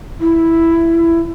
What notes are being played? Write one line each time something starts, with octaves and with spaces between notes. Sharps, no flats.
E4